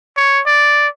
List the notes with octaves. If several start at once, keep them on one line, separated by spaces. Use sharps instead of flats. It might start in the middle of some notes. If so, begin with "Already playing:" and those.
C#5
D5